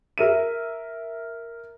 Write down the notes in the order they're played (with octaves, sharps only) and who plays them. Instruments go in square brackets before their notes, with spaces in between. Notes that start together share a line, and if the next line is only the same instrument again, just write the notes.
[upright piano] A#4 E5 D#7